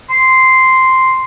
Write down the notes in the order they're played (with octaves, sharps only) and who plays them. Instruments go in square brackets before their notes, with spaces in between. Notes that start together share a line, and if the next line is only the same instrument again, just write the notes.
[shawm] C6